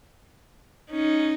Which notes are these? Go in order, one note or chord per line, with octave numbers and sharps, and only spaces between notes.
C#4 D#4